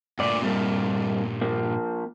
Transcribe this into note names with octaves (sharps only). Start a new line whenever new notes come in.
D2 G2 A#2 D5
C3 G3 A#3
F3 A#3